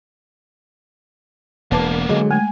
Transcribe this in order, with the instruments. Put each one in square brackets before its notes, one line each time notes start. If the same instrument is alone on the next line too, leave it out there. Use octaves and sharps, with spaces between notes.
[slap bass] E1 [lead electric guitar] A#3 B3 [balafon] B4 A5 D6
[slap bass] D3 F#3 [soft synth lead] G#3
[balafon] G#3 A3 [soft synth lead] G#5